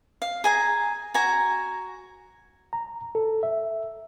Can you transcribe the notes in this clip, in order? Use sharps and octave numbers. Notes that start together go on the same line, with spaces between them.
F5
G#4 G#5 A#5
F#4 G#5 A#5
A#5
A4
E5